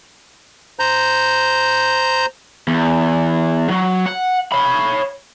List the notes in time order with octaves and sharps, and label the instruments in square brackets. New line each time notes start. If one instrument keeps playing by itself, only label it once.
[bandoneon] C5 A#5 G6
[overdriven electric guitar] E2
F#3
F#5
C#5 B5